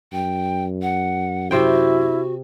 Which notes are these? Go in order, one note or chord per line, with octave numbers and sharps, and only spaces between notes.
F#2 G5
F#5
C3 E4 F#4 C5 G5